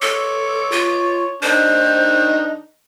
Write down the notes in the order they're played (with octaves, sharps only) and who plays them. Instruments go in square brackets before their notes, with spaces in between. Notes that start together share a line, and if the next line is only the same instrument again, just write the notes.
[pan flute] A4 [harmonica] C#5 D6
[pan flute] F4
[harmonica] D#3 D4 D#4 [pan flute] C5